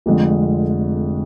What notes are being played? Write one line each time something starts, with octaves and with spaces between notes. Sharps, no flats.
F1 F2 D3 G#3 D4